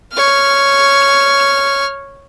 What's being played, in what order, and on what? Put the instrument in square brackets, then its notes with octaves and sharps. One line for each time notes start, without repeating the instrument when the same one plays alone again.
[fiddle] C#5 F6